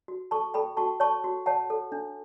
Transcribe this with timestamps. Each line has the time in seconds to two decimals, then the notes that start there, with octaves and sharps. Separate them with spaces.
0.08 F#4
0.31 A4 A5 C#6
0.54 A4 G5 B5
0.77 F#4 A5 C#6
1.00 C#5 A5 C#6
1.24 F#4
1.46 C#5 F#5 A5
1.70 A4
1.92 D4